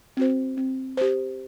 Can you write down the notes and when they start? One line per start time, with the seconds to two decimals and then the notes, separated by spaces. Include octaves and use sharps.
0.17 C4 F#4 C5
0.57 C4
0.97 G4 C5